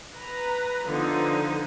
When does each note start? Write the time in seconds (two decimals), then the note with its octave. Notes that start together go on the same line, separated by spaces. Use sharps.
0.15 B4 A#5
0.86 D3 F3 B3 D#4